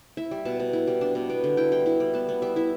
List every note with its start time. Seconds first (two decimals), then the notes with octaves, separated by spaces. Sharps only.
0.17 E4 E5
0.31 G3
0.45 B2 A5
0.60 B2
0.73 E4
0.87 G3
1.01 D4 A5
1.15 B2
1.30 B3 G5
1.44 D3
1.57 E4 G5
1.72 G3 G5
1.86 E4
2.00 G3
2.14 B3 A5
2.29 B3
2.42 G3 E5
2.56 E4 E5